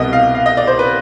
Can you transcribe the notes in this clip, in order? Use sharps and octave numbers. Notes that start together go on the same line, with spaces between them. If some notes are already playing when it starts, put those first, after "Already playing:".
Already playing: C2 B2 B3 D#5
F5
F5
D#5
D5
C5
B4